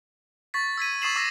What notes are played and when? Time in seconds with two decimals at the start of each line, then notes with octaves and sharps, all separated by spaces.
0.54 C#6 A6 B6
0.77 E6 G#6 B6 D#7
1.02 C#6 D#6 A6 C7 E7 F#7
1.16 D6 E6 A#6